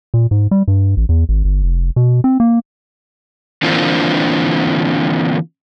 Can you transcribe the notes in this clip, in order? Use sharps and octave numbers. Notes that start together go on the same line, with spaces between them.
A#2
G#2
G3
G2
A1
E2
G#1
G1
F1
B2
C4
A#3
D3 E3 A#3 C4 D4 F4